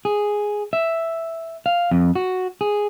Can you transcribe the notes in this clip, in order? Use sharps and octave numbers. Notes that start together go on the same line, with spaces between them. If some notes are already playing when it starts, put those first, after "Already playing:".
G#4
E5
F5
F2
F#4
G#4